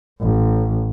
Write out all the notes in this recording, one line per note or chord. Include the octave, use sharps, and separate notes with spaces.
A1